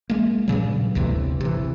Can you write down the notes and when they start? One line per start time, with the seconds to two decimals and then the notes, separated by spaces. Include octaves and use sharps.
0.10 G#3 A#3
0.48 G2 A#2 C#3 F#3
0.95 G1 D2 C3 E3
1.41 C3 E3